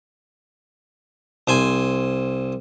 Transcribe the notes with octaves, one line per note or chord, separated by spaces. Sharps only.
C2 C5 G#5